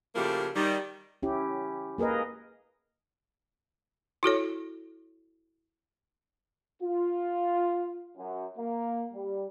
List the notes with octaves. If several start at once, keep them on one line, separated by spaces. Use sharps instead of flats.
C#3 F3 A3 A#3 E4 G4
D#3 G3
C#4 E4 G4
A#3 G#4 A#4 B4 D#5
E4 F#4 A4 C#5
F4
F#2
A#3
G3